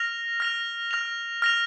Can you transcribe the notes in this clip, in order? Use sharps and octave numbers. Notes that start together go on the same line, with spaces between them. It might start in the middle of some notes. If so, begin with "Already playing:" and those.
Already playing: F6 A#6 F7
F6 A#6 F7
F6 A#6 F7
F6 A#6 F7